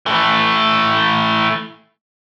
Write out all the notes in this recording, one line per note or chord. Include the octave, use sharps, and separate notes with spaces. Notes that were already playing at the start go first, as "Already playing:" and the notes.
E3 A3